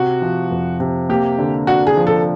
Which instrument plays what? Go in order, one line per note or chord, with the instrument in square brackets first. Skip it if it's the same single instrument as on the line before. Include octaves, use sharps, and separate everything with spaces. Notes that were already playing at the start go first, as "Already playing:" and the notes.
Already playing: [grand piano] C3 [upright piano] F#4
[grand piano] F3
F2
C3
[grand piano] A#3 [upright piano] G4
[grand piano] D3
[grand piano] D4 [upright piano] F#4
[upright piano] G#4
[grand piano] F3
[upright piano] A4